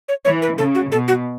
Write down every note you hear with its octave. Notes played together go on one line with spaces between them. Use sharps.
C#5
E3 C#5
B4
C#3 A4
F#4
B2 A4
F#4